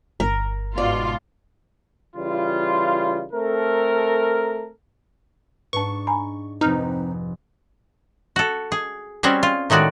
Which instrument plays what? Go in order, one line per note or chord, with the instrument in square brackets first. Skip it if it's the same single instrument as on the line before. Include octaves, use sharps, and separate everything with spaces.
[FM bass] G1 [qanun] A#4
[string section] G#2 B2 F4 [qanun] D5
[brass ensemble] C#3 E3 G3 F4
A3 C4 A4 A#4
[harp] G#2 D4 [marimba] B4 A5 [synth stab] C#6
[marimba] G#5 A#5 B5
[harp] F1 B4 [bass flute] C4 [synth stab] D#4 [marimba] A#5 F6
[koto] F#4 A4
G#4
G3 C4 C#4 F#4 G#4
F4
A2 D#3 G#3 F#4 D5